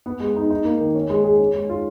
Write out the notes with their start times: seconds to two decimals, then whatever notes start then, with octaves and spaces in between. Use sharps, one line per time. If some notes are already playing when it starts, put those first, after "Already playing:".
0.06 B3
0.20 G#3
0.36 D#4
0.50 D#4
0.65 A#3
0.80 D#3
0.95 C#4
1.10 G#3
1.24 G#4
1.39 C#4
1.54 G#3
1.69 F4